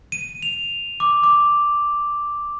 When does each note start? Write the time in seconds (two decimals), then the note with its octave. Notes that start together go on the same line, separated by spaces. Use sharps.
0.12 D#7
0.43 F7
1.00 D6
1.24 D6